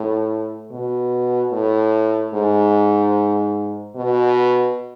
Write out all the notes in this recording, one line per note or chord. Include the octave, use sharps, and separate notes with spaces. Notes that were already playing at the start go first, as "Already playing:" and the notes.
Already playing: A2
B2
A2
G#2
B2